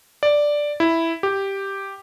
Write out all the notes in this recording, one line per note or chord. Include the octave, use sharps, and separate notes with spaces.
D5
E4
G4